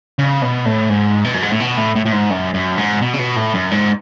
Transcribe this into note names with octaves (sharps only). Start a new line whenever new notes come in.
C#3
B2
A2
G#2
B2
F#2
G#2
A2
B2
A2
A2
A2
G#2
F#2
F#2
G#2
B2
C#3
B2
A2
F#2
G#2